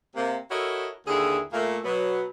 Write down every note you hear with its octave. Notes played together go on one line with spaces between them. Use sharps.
C3 A#3
E4 F#4 A4 A#4 C#5 D#5
D#2 D3 E4 G#4
A#2 A3 A#3
B2 F#3 B3